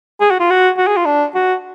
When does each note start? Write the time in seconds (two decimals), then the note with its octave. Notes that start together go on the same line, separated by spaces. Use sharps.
0.20 G#4
0.31 F#4
0.40 F4
0.50 F#4
0.78 F#4
0.87 G#4
0.97 F4
1.05 D4
1.35 F#4